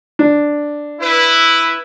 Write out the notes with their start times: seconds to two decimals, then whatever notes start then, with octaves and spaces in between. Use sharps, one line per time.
0.19 D4
1.00 E4 B4